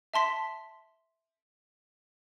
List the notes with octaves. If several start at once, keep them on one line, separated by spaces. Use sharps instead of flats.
E5 A5 C6 B6